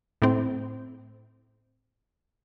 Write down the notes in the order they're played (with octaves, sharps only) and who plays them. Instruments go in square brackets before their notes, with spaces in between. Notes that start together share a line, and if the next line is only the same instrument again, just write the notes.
[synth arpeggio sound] A2 C4